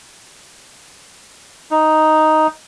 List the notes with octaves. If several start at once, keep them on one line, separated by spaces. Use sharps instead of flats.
D#4